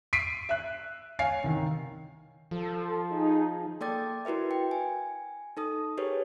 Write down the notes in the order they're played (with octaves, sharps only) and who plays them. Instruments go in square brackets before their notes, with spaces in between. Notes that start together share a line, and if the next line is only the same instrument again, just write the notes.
[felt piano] B6 C7 D7 D#7
E5 F#6
C#5 F5 G#5 C7
C2 D#3
[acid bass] F3 [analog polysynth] A4
[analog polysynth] D#4 G#4
[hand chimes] A#3 A4 D5 G5 D6 A6
E4 F#4 A#4 B4 E5
G5 C#7
G#5
D#4 A4 D#6
G4 G#4 A#4 B4 C#5